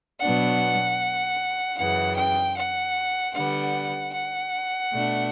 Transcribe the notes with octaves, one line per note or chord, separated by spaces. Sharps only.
B2 F#3 B3 D4 F#5
F#2 C#3 E3 F#5
G5
F#5
D3 G3 B3 F#5
F#5
B2 A3 D4